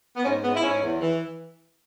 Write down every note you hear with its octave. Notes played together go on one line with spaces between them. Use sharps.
B3
G#2 C#4
G#2 B3
E4
G#2 C#4
E2
E3